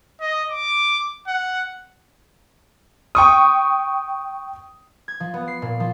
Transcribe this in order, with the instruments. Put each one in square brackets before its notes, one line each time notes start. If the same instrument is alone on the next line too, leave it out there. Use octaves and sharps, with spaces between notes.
[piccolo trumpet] D#5
D6
F#5
[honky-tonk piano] G5 C#6 D#6
[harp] G#6
F3
B3
C7
A#2
F3